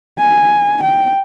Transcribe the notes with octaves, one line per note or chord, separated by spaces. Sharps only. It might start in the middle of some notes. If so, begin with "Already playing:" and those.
G#5
G5